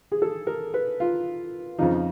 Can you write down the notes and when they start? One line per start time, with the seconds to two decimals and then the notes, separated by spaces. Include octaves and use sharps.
0.12 G#4
0.22 A4
0.47 A#4
0.74 B4
1.00 F4
1.78 F2 C#3 F3 D#4